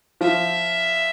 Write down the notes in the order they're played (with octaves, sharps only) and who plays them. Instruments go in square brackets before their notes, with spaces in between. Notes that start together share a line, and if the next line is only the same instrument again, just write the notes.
[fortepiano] F3 [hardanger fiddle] E5